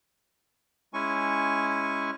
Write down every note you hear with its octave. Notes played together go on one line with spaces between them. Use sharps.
G#3 C#4 E4 G#5 C#6